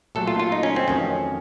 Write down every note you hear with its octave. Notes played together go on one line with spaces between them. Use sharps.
A#2 F#3 A3 A4
F4
F4
D#4
C#4
C4
F2 D#3 F#3 A3 C#4